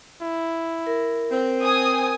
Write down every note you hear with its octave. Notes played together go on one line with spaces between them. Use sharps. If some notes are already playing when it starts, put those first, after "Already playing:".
E4
A#4
C4
G#5 D#6